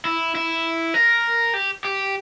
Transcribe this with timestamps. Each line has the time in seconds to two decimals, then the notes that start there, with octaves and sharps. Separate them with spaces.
0.05 E4
0.35 E4
0.94 A#4
1.54 G4
1.85 G4